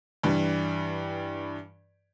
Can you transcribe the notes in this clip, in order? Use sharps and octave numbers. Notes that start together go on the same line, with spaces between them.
G2 E3 G3